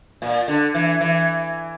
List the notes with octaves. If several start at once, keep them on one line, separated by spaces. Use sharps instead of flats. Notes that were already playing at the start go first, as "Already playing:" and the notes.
A#2
D3
E3
E3